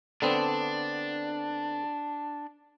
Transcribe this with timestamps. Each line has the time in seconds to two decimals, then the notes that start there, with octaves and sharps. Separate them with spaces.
0.22 D3 B3 C4 D4